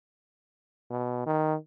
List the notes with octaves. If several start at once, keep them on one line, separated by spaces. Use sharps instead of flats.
B2
D#3